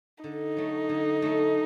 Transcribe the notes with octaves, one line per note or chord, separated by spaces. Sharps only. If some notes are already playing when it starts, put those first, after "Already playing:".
D3 D#4
F#3 A3
D3
F#3 A3